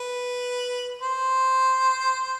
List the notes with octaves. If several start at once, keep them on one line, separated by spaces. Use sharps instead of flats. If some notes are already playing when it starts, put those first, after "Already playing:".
Already playing: B4
C5